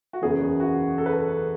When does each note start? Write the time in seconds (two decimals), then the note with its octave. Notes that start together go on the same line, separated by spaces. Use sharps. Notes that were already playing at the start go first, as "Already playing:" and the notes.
0.13 F#4
0.22 F#1 E2 C#3 E3 G#4
0.60 F#4
0.98 A4
1.06 B4
1.13 A4